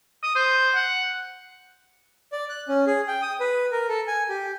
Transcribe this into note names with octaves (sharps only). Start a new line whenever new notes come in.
D#6
C5
F#5
D5
F#6
C#4
G#4
G5
D#6
B4
A#4
A4
G#5
G4